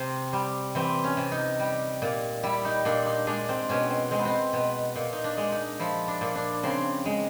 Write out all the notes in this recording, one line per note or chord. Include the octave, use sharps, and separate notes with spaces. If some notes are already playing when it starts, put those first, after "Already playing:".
Already playing: C3 C4
G3
E3 C4
C#4
C3
D#4
G3
A#2
G3 E4
D#4
A#2 D4
D#4
G#3 D4
C4
B2 C#4
C4
G#3 C4
B3
C4
B2
A#2
D#4
D4
G#3
D#4
F3 E4
D4
A#2
D4
C#3 C4
G#3